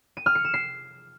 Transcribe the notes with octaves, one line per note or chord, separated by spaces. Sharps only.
D#7
F6
C#7
E7
C7